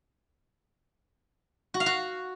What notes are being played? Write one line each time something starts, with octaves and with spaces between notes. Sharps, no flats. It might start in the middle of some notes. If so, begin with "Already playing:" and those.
F#4
F5
F#4